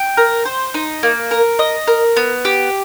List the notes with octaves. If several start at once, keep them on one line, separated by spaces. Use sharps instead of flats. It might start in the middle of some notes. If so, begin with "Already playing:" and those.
Already playing: G5
A#4
C5
D#4
A#3
A#4
D#5
A#4
B3
G4